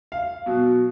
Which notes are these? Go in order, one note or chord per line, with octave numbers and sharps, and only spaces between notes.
F5
B2 F#3